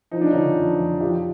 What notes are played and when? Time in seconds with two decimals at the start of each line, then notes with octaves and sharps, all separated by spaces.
0.11 F3 D#4
0.21 D4
0.31 D3 C#4 D#4
0.57 F2
0.78 F2
1.00 F3 F4 G4